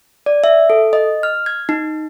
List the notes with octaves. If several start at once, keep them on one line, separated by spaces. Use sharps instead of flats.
D5
E5
A4
D#5
F6
G#6
D#4